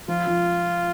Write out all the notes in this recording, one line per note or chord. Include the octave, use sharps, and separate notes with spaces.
F3 F4
F3